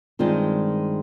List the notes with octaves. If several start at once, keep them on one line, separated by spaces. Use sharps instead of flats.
G2 D#3 G#3 C4 F4